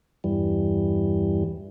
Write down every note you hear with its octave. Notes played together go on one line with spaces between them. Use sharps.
E2 G2 E3 G3